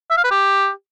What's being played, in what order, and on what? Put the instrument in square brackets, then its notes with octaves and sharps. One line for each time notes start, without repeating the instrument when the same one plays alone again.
[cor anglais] E5
F5
B4
G4